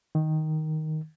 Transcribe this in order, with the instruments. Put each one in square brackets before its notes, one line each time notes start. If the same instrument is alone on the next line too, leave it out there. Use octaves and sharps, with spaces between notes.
[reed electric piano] D#3